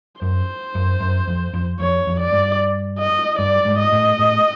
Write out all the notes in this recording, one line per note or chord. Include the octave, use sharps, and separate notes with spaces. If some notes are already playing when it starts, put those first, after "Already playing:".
F#2 C5
F#2
F#2
F2
F2
F2 C#5
F2
D5
G2
D#5
G2 D5
G#2
D#5
A2
A2